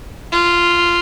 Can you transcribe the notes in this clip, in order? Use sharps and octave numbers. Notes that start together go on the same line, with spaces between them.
F4